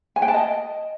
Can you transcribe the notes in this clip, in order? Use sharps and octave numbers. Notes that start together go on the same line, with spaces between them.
G#5
G5
A5
D#5